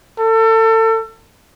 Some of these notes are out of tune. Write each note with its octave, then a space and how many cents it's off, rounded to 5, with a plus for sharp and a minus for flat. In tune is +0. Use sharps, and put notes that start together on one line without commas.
A4 +30